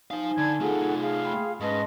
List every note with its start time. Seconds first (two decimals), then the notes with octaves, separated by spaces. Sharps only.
0.11 D#4 C5 F5 G#5
0.38 D3 A5 B5 G#6
0.60 A3 F4 G#4 A4 F#5
1.00 G#4 F5
1.24 G5 B5 C6
1.60 G#2 C#4 B4 D#5 A5 C6